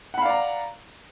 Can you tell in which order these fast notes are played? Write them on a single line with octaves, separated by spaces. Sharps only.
F#5 B5 F5 D5 A#5